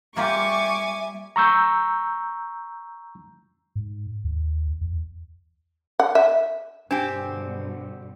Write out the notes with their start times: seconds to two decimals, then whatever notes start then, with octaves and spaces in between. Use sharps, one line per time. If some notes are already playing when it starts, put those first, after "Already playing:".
0.17 G3 A#3 F4 G4 E5 G#5 C#6 D6
1.36 A#5 C#6 E6 G6
3.75 G#2
4.24 D#2
4.81 E2
6.00 F#5
6.15 E5
6.91 G2 B2 D3 C4 D4 G4 G#5